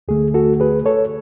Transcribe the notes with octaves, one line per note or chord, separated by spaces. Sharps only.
D2 D3 A3 G#4
F#4 A4
G#4 B4
A4 C#5